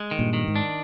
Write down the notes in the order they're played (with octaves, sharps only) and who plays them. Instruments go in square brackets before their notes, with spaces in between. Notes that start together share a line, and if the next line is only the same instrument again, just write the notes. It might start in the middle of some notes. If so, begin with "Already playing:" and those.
Already playing: [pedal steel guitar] G#3
D#3
[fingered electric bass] G2 A#2
[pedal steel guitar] D#3
[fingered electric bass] G#2
[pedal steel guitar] D4